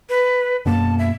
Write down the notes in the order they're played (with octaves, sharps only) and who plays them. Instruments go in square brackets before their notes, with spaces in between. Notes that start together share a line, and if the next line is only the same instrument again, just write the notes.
[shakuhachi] B4
[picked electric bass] F#2 B2 A#3 [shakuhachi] A5
[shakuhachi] E5